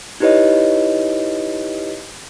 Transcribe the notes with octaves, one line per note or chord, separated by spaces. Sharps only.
D#4 E4 G4 B4 C#5 D#5